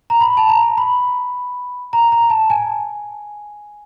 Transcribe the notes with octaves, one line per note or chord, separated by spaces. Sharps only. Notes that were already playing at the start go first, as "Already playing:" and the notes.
A#5
B5
A5
A#5
B5
A#5
A#5
A5
G#5